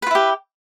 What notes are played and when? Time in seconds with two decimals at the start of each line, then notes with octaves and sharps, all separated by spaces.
0.02 B4
0.07 F4
0.11 E4
0.15 G4